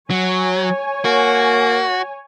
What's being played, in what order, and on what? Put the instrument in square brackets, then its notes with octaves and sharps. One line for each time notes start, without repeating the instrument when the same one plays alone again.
[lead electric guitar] F#3 [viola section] C#5 G#5
[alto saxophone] A#3 [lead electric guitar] F#4